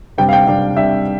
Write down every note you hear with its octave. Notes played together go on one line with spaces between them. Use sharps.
C3 G3 D4 G5
F5
G5
C3 G3 D4 F5
C3 G3 D4 E5